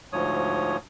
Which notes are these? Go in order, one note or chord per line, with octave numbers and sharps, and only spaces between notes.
D2 G#2 F3 C#5 D#6